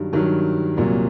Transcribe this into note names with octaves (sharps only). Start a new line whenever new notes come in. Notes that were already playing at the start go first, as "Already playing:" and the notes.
Already playing: G2 D#3 F#3
G2 D#3 F#3
C2 A#2 F#3